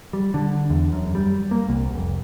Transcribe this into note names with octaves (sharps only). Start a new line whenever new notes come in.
G3
D3
E2
F#2
G3
A#3
C2
F1